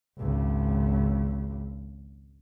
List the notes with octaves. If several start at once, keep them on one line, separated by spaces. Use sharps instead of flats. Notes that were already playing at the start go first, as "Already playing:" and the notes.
G#1 C#2